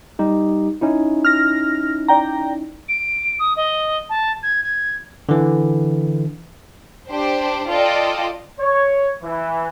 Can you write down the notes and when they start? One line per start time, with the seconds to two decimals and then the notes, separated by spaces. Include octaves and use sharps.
0.19 G3 D#4 G4
0.81 C#4 D#4 E4
1.25 F6 A#6
2.08 D5 G5 A#5
2.89 D7
3.39 D#6
3.57 D#5
4.10 A5
4.43 G#6
4.63 G#6
5.29 D3 E3
7.11 D4 G4 C5
7.70 F4 A4 D5 D#5 G5
8.60 C#5
9.23 E3